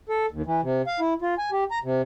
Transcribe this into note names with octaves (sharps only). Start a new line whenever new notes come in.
A4
D#2
E3
C3
F5
E4
F4
G#5
G4
A#5
C3